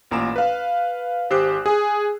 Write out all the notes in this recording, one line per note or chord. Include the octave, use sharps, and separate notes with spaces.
A1 A#2 A#5 E7
B4 F5
G#1 G4 C5 E6 F#6 C7
G#4